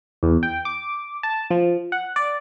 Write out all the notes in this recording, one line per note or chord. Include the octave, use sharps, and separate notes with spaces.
E2
G5
D6
A5
F3
F#5
D5